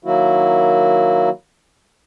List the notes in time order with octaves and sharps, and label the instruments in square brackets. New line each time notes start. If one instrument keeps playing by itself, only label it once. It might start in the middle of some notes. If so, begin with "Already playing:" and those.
[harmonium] D#3 F#3 A#3 E4 F#4